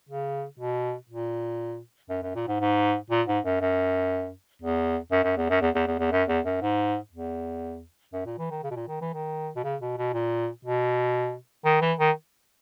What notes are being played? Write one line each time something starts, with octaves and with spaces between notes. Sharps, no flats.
C#3
B2
A#2
F#2
F#2
A#2
G#2
G#2
A#2
G#2
F#2
F#2
E2
F#2
F#2
E2
F#2
E2
E2
E2
E2
F#2
E2
F#2
G#2
E2
F#2
A#2
E3
D#3
C#3
B2
A#2
D#3
E3
D#3
B2
C#3
B2
B2
A#2
B2
D#3
E3
D#3